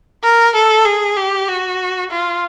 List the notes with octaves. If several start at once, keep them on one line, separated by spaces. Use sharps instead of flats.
A#4
A4
G#4
G4
F#4
F4